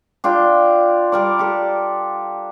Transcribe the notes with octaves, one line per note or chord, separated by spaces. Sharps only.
D4 F4 G5
G3 A#4 D5
G4 A4